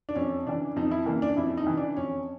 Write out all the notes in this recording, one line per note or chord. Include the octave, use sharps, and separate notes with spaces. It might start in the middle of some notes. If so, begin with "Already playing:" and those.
D4
F2 C#4
C#3 E3 D4
F2 D#4
E4
C#3 E3 A#3
D4
F2 E4
D#4
C#3 E3
D4
F2 C#4